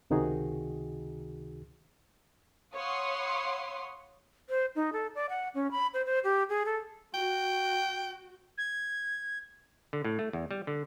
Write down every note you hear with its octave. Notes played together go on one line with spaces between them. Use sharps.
C#2 C3 D#3 D#4 F#4 G#4
C#5 F5 F#5 B5 C6 D#6
C5
D#4
A4
D5
F#5
C#4
B5
C5
C5
G4
G#4
A4
F#4 G5
G#6
D3
A2
A3
E2
G3
D3